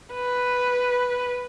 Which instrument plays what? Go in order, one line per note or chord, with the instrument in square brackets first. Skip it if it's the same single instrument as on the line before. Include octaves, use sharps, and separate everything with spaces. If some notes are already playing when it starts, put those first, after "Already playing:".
[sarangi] B4